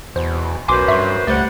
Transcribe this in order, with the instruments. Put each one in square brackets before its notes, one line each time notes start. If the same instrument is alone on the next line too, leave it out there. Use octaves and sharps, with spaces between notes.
[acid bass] E2 [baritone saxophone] B2 [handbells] C5
[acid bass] B1 [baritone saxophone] F#2 [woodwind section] B4 C5 [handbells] G#5 C6 D6
[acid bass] G2 [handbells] E5 C#6
[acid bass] C#2 [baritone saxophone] G3 [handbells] A3 C5 [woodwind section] F#5